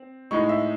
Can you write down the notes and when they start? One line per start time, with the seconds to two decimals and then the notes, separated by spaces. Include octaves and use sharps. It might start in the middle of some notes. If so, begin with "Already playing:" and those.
Already playing: C4
0.31 A2 G#3 D#4 C#6
0.49 E5